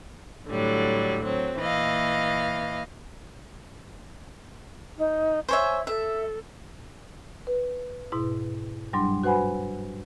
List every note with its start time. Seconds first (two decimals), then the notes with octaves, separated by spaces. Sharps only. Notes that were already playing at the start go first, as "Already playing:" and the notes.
0.49 A2 D3 F#3 G3
1.25 F#3 C4
1.58 A#2 E3 D#5 F5
4.98 D#4
5.49 C5 C#5 E5 G#5
5.87 A4 E5
7.47 B4
8.12 G#2 B2 E4
8.93 G2 F#3 G3 D4 C6
9.24 F#4 B4 C5 F#5 G#5 B5